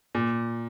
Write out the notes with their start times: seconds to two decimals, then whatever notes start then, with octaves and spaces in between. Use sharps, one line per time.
0.15 A#2